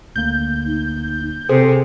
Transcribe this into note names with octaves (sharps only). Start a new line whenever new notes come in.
D2 D3 A#3 G6
D#4
C3 G#4 A4 C5